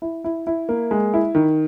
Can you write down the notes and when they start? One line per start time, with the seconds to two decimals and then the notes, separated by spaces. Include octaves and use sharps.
0.02 E4
0.24 E4
0.47 E4
0.69 A#3
0.91 G#3
1.14 E4
1.35 D#3